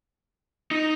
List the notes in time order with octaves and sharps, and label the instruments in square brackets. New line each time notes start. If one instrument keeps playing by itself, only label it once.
[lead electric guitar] D#4